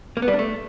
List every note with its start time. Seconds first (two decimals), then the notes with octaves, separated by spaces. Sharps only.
0.17 A#3
0.22 B3
0.28 G3
0.33 D4
0.39 A3